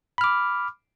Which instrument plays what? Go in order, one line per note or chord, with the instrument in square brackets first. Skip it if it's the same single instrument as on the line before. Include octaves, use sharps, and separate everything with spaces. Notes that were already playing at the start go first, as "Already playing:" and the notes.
[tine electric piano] B5
F6
D6